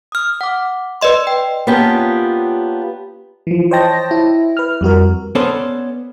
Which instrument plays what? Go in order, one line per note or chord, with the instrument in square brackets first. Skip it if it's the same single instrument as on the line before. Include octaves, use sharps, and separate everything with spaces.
[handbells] D#6 F6
F#5 D6
B4 D5 D#5 C6
G5
[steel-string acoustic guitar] A#3 B3 C#4 D4 F4 G4
[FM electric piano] E3 F3
C5 C#5 D#5 G5 A5 A#6
E4
B4 F6
F2 G3 F#4 A#4
[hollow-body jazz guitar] B3 C#4 A4 C5 D5